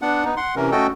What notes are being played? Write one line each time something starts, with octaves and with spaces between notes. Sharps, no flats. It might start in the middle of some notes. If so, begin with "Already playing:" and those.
B3 D4 F#5
B3 D#4
F#5 C6
C3 E3 C#4 A#4
A3 C#4 F#4 A4 D#5 G5